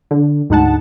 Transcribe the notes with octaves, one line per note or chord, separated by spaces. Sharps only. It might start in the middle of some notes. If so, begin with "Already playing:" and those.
D3
D2 G#2 D#4 F#5 A5